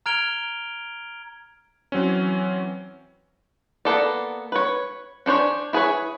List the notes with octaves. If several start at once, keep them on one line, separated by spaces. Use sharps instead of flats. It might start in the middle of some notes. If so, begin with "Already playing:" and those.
A#5 F6 G#6 D7 F7 G7
E3 F#3 C4 C#4
A#3 B3 A4 D5
B4 C#5
C#4 D4 C5 C#5
E4 G#4 B4 C#5